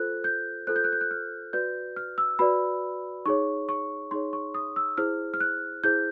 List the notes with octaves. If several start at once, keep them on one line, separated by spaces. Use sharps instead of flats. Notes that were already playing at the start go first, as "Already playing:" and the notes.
Already playing: F4 A4 C5 F#6
G6
F4 A4 C5 F#6
G6
F#6
G6
F#6
F6
F#4 B4 D5 G6
F6
E6
F#4 B4 D5 B5
D#4 G#4 C#5 C#6
C#6
D#4 G#4 C#5 C6
C#6
D#6
E6
E4 G#4 C5 F6
F6
F#6
E4 G#4 C5 G6